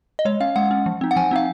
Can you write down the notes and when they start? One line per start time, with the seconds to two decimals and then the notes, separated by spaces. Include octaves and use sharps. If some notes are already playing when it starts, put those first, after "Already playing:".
0.19 D#5
0.25 G#3 C#5
0.40 C#4 F5
0.56 G#3 F#5
0.71 C#4
0.86 F3
1.01 C4 D#4
1.11 F#5
1.16 F3 G#5
1.31 C4 D#4 F5